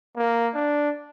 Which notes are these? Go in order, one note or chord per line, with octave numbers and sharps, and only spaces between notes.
A#3
D4